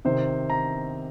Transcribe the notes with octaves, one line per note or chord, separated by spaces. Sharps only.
C3 D#3 C5
A#5